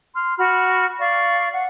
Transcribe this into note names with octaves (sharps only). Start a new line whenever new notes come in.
C6 F6
F#4 B5 F6
D5 F5 C#6
F#5